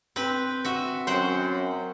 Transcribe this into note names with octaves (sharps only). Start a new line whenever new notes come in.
C4 B4
F#4 E5
F#2 C5 F#5 G5